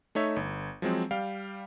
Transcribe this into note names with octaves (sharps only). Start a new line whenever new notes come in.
A3 D#4 C#5 E5
G1
F3 F#3 G#3 C4
G3 F5 G5